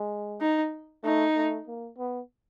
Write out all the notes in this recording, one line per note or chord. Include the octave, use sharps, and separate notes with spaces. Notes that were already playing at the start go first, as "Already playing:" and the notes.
Already playing: G#3
D#4
A3 D#4
A3
A#3
B3